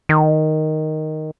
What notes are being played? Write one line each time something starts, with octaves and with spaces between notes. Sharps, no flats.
D#3